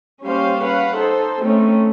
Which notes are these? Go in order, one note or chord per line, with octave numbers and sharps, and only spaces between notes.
G3 A#3 C#4 G4 C5 F5
C#4 B4 F5 F#5
D#4 A4 C5
A3 C4 C#4 D#4